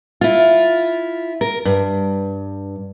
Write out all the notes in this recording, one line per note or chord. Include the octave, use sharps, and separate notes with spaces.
E4 F4
A#4
G2